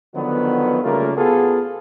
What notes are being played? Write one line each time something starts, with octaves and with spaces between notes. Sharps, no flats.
D3 D#3 F3 F#3 B3
C#3 G3 A3 A#3 F4 A#4
B3 F4 F#4 G#4 A4